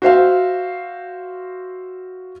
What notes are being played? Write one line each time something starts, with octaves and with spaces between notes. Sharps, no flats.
F#4 C5 E5 F5